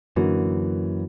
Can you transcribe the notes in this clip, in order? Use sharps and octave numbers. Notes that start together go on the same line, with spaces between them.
F#2 D3 E3 A#3 F#4